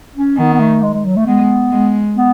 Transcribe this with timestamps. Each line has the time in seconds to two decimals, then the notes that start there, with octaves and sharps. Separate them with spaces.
0.16 C#4
0.37 D#3 B3
0.54 B3
0.60 A3
0.82 G#3
0.94 G#3
1.05 F#3
1.16 A3
1.27 G#3 B3
1.72 G#3
2.17 B3